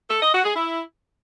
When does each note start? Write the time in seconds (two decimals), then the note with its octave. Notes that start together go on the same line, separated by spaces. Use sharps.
0.10 A4
0.21 D#5
0.33 F#4
0.44 G#4
0.55 E4